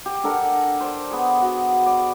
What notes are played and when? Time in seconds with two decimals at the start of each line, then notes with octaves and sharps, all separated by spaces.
0.06 G4
0.23 D4 A4 A#4 F#5
0.80 C5 D5
1.11 B3 G#4
1.41 F#4
1.86 D5